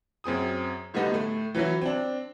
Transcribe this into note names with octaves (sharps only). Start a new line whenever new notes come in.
F#2 C4 G#4 D#6
A2 D3 G3 B3 D#4
A2 A3
E3 F#3 C#4 E4
C4 D4